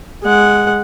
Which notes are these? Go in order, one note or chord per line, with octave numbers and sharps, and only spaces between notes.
G#3 F#5